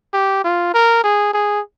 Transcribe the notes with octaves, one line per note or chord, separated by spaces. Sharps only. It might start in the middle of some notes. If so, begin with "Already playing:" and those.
G4
F4
A#4
G#4
G#4